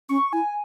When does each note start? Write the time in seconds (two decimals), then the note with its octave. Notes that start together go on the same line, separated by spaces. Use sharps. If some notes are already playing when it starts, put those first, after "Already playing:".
0.09 C#4 C#6
0.33 E4 G#5